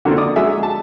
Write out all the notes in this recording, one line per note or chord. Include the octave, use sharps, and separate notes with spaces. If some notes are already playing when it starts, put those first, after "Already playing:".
D3 F#3 A#3 C4 D4 F4
D5 D6 D#6
F#3 G#3 G#4 E5 G#5
A5